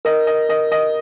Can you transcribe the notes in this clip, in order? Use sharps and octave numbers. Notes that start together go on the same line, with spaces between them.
A#4 D#5
D#5
A#4 D#5
D#5